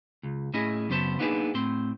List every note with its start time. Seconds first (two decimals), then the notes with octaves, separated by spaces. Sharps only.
0.23 C#2
0.54 A2 C#4 E4 G#4 D#5
0.89 F#2 C#3 B3 C5 A5
1.19 A#3 B3 D4 D#4 G#4 B4
1.54 A2 C4 C6